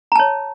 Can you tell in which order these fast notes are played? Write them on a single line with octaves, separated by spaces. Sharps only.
A#5 A5 C#5